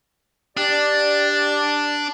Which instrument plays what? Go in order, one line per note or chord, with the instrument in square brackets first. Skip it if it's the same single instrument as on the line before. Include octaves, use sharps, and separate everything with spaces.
[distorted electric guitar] D4 [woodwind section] G4 D5